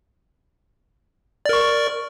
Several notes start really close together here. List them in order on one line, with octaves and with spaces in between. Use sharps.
D5 A#4 C#6